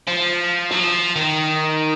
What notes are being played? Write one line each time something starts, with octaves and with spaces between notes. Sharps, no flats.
F3
F#3
F3
D#3